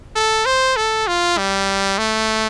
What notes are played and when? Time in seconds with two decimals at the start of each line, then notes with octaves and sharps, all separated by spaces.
0.16 A4
0.46 C5
0.76 A4
1.07 F4
1.38 G3
1.98 A3